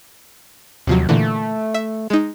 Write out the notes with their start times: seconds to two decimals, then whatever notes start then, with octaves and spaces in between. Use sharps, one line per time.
0.87 D#2 C3 F3 F#3
1.09 A#2 D3 E3 A3
1.74 E5
2.10 G#3 D#4